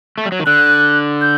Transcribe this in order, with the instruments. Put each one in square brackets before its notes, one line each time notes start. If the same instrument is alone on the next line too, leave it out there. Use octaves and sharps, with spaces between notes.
[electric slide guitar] A3
G3
F#3
D#3
[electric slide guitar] D3 [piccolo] F#6
[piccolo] G6